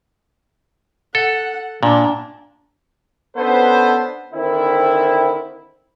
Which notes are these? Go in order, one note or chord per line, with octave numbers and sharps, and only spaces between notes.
A4 F#5
A#2 D4
B3 C#4 D4 A4 B4 C5
D3 D#3 C4 E4